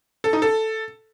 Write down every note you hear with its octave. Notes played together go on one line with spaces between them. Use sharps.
A4
D#4
A4